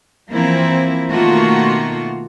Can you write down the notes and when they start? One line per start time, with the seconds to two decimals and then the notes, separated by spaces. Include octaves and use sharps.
0.31 E3 F3 A#3 C4 E4
1.09 B2 D#3 A3 A#3 F4 F#4